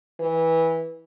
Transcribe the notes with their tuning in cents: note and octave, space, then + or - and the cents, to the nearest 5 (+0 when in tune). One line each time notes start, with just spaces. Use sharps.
E3 -15